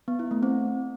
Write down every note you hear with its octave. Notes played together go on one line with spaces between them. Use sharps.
B3
E4
A3
C4